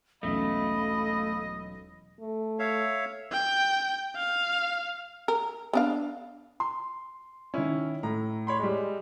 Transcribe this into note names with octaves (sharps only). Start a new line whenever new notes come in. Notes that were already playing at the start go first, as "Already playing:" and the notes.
E1 B1 A3 C#4 A4 D#5 F5 B5
A3
C#5 E5 F5
G5
F5
A#4
B3 D4 F5
C6
D#3 C#4 E4
A2 A#5
C#5 B5 C6
G3 G#3